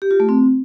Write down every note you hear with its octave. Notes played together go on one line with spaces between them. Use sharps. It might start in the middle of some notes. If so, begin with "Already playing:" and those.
G4
F4
A3
C4